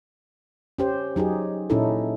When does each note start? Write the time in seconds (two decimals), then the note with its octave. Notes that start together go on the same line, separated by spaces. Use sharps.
0.79 C#4 G4 C5
1.16 F#3 D#4 G4 G#4
1.70 A#2 C#4 D#4 E4 A4